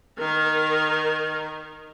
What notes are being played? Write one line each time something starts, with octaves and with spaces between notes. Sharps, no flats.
D#3 A#4